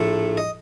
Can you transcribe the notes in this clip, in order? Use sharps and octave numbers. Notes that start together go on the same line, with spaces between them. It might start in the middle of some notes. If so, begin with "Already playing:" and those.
Already playing: A#1 A2 A3
D#5